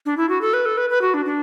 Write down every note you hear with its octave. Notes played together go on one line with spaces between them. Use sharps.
D4
E4
F#4
A4
B4
A4
B4
B4
F#4
D4
D4